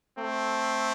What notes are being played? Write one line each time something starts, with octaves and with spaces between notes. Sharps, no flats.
A3 C4